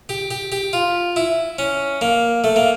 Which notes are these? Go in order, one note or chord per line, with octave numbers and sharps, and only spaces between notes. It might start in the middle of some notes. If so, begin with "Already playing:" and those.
G4
G4
G4
F4
E4
C#4
A#3
A3
A#3